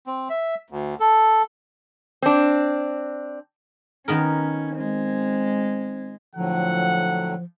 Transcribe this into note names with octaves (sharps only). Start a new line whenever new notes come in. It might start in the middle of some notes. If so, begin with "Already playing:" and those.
C4
E5
D2
A4
C4 D4
D#3 B3 C#4 A#4
G#3 C4
A2 D3 F3 F#3 F#5